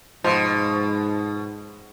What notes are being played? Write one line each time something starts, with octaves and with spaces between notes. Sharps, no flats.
G#2 B2 F3 C5 C6